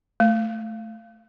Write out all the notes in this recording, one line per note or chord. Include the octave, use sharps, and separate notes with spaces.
A3